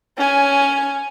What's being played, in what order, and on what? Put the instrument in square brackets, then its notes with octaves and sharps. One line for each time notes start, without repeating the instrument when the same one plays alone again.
[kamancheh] C#4 G#5